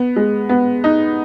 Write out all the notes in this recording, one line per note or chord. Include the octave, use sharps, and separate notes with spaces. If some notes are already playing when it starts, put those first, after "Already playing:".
Already playing: B3
G#3
B3
D#4